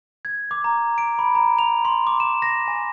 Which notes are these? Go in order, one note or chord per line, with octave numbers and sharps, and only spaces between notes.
G#6
D6
A#5
D7
B5
A#5
F7
C6
D6
E7
A#6
G#5